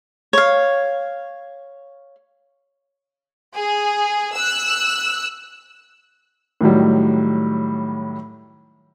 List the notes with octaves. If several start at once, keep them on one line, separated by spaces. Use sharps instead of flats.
C#5 F5
G#4
E6 F#6
A2 D#3 F#3 G3